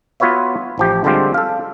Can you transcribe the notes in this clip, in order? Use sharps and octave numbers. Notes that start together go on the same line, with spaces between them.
B3 F4 F#4 B4 C#5 E5
A1 F3 G4
D3 G3 G#3 C4 F4 G4
A4 F5